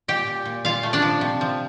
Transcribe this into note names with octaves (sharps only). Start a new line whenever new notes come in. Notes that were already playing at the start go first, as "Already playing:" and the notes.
A#2 G4 G5
A#2
A#2
A#2 F4 F5
A3
D4 D5
F3
C3
F3